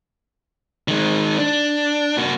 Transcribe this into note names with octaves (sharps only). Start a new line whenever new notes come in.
D#3 G#3
D4
A#3 F#4